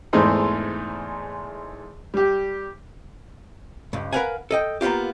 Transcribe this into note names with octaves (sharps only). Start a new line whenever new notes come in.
E2 G#2 E3 A3 C4 D#4
G3 G4
C#2 G2
A#4 B4 D#5 F5 F#5 G#5
A4 D#5 G5
A#3 B3 C#4 F4 G4